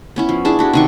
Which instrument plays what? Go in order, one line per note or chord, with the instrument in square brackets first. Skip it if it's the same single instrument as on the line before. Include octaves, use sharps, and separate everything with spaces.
[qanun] B3 C#4 E4
F3
D4 E4 G#4 A5
D4 F#4 G4
C3 D#3 C#6